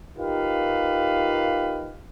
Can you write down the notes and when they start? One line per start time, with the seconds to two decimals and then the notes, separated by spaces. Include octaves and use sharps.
0.18 D#4 F4 G4 A#4 B4 F5